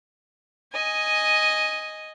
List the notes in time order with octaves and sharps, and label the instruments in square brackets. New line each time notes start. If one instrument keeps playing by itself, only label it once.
[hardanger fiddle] D#5 G#5